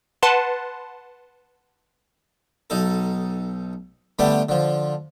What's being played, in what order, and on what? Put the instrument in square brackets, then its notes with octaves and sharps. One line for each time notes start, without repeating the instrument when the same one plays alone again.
[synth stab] B4 F#5 A5 C6
[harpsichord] B1 D#4 A4
D3 G3 A3 B3 D4 G4
D3 F3